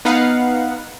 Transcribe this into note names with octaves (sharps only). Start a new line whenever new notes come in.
B3 D#4 B4 F5 F#5